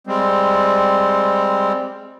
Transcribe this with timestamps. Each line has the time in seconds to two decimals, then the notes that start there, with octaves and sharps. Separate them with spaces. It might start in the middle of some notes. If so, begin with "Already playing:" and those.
0.07 G3 G#3 C4